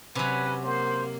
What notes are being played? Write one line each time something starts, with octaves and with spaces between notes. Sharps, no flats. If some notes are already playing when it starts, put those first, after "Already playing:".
C3 F#3 C#4 B4
A#3 C5